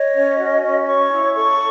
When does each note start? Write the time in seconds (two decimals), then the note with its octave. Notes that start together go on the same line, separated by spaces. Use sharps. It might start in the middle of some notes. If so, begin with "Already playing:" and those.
Already playing: C#5 D#5
0.13 C#4
0.38 F#4
0.62 C#4
0.86 C#5 C#6
1.10 E4
1.35 A4 C#6